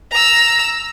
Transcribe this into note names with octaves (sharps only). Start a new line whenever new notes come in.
A#5 E6